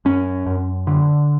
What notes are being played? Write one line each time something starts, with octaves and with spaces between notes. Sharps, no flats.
F#2 C#4
F#2
D3